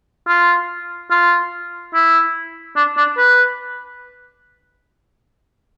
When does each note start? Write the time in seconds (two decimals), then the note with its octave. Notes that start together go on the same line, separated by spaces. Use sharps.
0.28 F4
1.11 F4
1.94 E4
2.76 D4
2.97 D4
3.17 B4